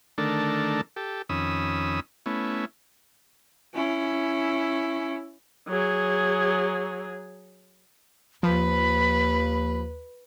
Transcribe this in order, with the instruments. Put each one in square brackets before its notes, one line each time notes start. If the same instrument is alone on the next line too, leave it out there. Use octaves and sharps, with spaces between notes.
[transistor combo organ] D3 D#3 A3 D4 A4 A#4
G4 A4
F2 D#3 C#4 B5 D#6 E6
A3 B3 C#4 E4
[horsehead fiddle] C#4 E4
[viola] F#3 G#4
[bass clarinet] D#2 [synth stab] F3 [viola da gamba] B4 [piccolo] B5